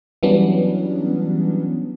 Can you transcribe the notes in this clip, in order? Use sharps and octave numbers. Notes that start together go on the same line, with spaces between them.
E3 F#3 G3 B3 C#4 D4